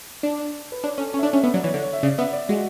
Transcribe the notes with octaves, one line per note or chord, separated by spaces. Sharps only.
D4 D5
B4
D4 C#5
C#4 A4
C#4 C#5
E5
D4 D5
C#4 E5
B3 E5
F#3 D5
E3 C#5
D3
C#5
E5
C#3 D5
B3 E5
D5
G#3 F#4